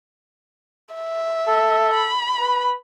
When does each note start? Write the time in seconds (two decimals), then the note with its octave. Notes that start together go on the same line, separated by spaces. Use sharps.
0.95 E5
1.47 A4
1.95 B5
2.40 B4